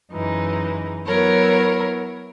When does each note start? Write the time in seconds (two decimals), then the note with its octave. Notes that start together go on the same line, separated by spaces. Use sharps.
0.11 F#2 E3 G#3 D#4
1.07 F#3 B3 E4 A#4 C#5